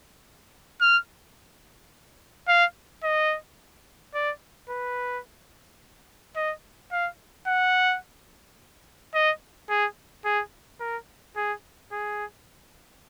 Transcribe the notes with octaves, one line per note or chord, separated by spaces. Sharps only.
F6
F5
D#5
D5
B4
D#5
F5
F#5
D#5
G#4
G#4
A#4
G#4
G#4